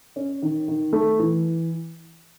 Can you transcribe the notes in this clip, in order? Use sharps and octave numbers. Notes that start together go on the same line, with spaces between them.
C#4
D#3
D#3
A3
E3